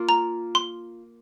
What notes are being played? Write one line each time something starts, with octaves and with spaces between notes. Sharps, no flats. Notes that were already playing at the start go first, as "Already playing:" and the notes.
Already playing: A#3 F4
A#5
C6